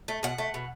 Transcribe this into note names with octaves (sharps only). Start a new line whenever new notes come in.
A3
B2 F#5
A3
B2